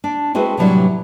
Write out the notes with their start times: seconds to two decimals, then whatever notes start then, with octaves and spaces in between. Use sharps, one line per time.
0.04 D4
0.34 G#3 C4 E4 F#4 G#4 B4
0.57 A2 C3 E3 F#3 G3 D4